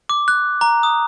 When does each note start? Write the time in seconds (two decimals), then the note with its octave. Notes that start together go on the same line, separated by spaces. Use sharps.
0.09 D6
0.28 F#6
0.61 A#5
0.83 D#6